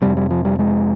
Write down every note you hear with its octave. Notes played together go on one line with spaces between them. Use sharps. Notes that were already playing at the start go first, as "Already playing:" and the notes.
F2 C3 G3
G3
F3
G3
G#3